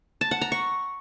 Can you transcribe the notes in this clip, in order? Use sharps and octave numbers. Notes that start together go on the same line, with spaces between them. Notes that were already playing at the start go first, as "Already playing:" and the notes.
A5
F#5
A#5
C#6